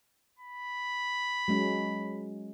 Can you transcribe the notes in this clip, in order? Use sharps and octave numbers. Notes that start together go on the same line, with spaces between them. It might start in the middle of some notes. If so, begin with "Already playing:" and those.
B5
F#3 G#3 C#4